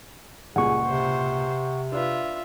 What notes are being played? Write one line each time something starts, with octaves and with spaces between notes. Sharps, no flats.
C#2 G2 A#2 G#4 F#5 C#6
C3 C5
D4 F4 B4 E5